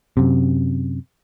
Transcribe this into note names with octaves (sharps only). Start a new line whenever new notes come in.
F#2 C3